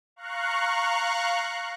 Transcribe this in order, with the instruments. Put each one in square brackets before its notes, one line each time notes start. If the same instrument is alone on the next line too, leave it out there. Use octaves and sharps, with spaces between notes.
[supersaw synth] F5 A#5 C#6 F#6